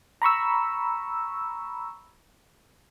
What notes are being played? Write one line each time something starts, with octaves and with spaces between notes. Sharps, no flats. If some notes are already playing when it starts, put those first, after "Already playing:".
A#5 B5 C#6 E6